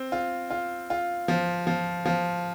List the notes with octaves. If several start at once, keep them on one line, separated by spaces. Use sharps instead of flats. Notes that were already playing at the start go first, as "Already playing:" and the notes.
Already playing: C4
F4
F4
F4
F3
F3
F3